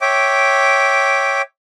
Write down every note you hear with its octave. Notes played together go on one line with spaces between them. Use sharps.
C#5 E5 G5 D6